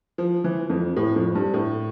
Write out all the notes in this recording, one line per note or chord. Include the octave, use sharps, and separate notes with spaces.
F3
E3
F2
A2
F2
G2
A2